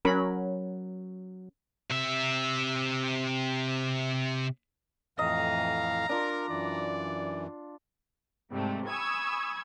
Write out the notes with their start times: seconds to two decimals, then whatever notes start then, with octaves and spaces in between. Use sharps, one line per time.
0.05 F#3 C#4 A#4 B5
1.90 C3 E5
5.19 F2 A2 E3 D#5 F5 A#5
6.09 D4 F4 A#4 D6
6.49 F#2 E3 D5
8.50 G#2 C3 G3 A3
8.89 G#5 B5 C#6 D#6 E6 G#6